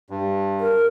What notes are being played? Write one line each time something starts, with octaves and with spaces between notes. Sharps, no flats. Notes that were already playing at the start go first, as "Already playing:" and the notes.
G2
A#4